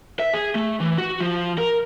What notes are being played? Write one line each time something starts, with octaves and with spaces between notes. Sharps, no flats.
E5
G#4
A3
E3
F#4
F3
A#4